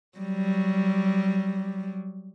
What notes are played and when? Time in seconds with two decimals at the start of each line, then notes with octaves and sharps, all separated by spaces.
0.18 F#3 G3